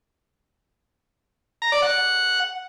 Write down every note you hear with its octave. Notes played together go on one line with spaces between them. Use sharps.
A#5
D5
F#5